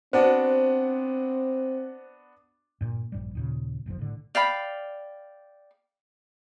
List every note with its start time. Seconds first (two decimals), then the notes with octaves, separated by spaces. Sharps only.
0.13 B3 C4 D4 F#4 C5
2.81 G2 A#2
3.12 A#1 G2 G3
3.35 D#2 A#2 C#3
3.86 F#1 B1 F2 F3
3.99 A2 D3
4.35 D5 F5 G5 B5